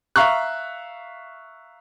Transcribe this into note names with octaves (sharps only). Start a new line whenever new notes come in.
E5 F5 A#5 C#6 F#6